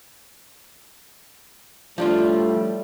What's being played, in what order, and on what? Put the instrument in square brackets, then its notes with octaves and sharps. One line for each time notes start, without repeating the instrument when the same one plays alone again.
[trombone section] A2 G3 A3 [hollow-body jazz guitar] F3 D4 F4